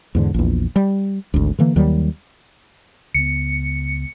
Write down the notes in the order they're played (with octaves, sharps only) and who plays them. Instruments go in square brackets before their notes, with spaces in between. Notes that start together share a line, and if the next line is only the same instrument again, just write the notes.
[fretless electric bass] E2 G#2 D3
A#1 E2
G3
G#1 D2
D3 E3 A#3
D#2 D#3 F#3 G3
[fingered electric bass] C#2 B3 [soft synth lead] C#7